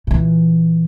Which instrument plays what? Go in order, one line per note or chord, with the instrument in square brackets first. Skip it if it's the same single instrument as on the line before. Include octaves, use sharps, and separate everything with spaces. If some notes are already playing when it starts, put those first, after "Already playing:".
[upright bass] A#2 E3